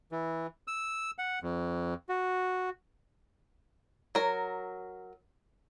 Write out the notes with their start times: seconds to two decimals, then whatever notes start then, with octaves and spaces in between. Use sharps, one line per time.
0.12 E3
0.68 E6
1.18 F#5
1.43 F2
2.09 F#4
4.15 F#3 A#4